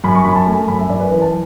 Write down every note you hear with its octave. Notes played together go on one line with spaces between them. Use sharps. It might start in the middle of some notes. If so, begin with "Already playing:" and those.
F#2 B5
C#6
F#2 B5
A5
A3 G#5
F#2 B5
E5
F#2 D5
B4
E3 B4
A5